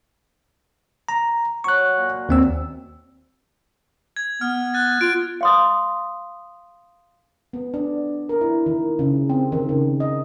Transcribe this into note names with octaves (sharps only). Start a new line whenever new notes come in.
A#5
F#3 C#5 C#6 F#6
A#2
D#2 C4 E6
G#6
B3 F6
F#6 A6
F4 D7
F5 C6 D#6
B3
D4
A#4
E4
D#3
C#3
C4
D#3
C#3
D#5